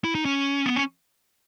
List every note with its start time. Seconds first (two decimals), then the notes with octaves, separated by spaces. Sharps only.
0.04 E4
0.15 D#4
0.25 C#4
0.66 B3
0.76 C#4